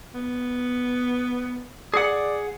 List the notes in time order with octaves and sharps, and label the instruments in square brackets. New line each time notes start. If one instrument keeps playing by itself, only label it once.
[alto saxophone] B3
[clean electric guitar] G#4 F#5 [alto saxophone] D5